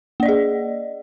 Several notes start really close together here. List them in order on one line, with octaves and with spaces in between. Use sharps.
A#3 D5 D#5 G#4